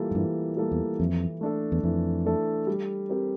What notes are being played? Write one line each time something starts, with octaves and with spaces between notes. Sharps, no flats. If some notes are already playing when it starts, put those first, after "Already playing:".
Already playing: E3 G3 A#3 F4 A4
A2
G2 E3
G3 A#3 F4 A4
E2
F2 E3
A3 D4 A4
E2
F2 E3
A3 D4 A4
G3
C4 G4 A#4